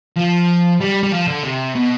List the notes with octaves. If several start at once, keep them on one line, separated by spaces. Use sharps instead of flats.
F3
G3
G3
F3
D3
C3
B2